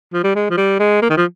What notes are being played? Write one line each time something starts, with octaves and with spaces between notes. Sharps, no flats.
F3
G3
G#3
F3
G3
G#3
A#3
D#3
F3